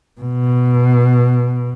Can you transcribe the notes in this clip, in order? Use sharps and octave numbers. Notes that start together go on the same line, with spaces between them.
B2